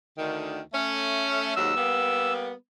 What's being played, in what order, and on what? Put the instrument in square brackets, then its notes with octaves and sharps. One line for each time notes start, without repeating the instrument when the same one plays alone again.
[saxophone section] D2 D3 D#3
A3 C#4
[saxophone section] D#2 G#2 F#3 [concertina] E6
[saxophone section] G3 A#3 B3